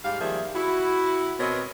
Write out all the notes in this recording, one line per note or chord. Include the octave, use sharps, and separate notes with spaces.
G#2 G3 G4 F5
D#3 F3 G3 A#3 G#4 E5
E4 F#4
B2 B3 C4 A#4 C#5 D#5